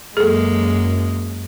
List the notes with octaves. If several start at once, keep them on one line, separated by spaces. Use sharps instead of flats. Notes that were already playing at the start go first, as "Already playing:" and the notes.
F#2 G#3 A#3 G#4 A4